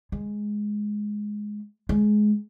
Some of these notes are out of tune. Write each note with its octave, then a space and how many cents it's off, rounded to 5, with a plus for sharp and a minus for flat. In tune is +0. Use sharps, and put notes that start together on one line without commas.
G#3 +5
G#3 +20